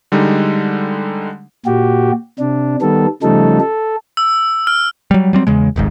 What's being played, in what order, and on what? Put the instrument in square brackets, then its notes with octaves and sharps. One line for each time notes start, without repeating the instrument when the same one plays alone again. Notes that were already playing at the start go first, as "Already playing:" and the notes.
[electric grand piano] D3 G3 G#3 D#4
[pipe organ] A#2 F#4 G4
C3 D4
D#3 G3 B3 A4
C#3 F3 G3 A3 D#4 A4
A4
[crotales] E6
F6
[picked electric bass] F#3 G3
F#3 G3 C4
E2 C#3 G#3
D#1 G#1 G#2